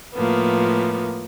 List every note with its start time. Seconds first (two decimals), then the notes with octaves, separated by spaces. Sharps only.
0.15 A2 F3 A#3 B3